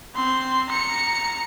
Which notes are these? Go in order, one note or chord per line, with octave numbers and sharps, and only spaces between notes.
C4 C6
A#5 C#7